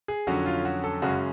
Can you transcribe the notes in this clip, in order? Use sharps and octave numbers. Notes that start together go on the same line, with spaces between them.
G#4
F2 D3 F#3 C#4 F#4
F4
F#4
A4
F#2 C#3 G#3 C#4 F#4